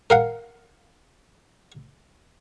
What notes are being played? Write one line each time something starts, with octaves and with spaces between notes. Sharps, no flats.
A#4 F5 F#5